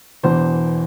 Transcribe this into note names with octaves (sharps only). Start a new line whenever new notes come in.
E1 E2 E3 C5